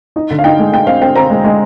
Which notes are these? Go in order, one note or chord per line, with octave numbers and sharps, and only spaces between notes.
D#4 D#5
D3
F5
D#4 G5
G#3
G#3 G5
C4 F5
C4 G5
C4 A#5
G#3
G#3